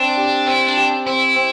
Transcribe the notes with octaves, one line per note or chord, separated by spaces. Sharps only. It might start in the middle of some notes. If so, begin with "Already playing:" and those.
Already playing: C4 D4
G4
C4 E4
D4
G4
C4 E4
C4